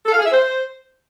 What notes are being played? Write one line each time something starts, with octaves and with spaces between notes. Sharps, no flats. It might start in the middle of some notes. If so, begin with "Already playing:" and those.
A4
F5
G#4
E5
C5